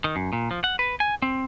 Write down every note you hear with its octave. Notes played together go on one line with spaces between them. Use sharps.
D#3
F#2
A#2
F3
F#5
B4
G#5
C4